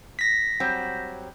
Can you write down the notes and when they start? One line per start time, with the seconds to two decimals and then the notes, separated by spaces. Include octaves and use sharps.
0.19 A#6 B6
0.60 F#3 G3 C4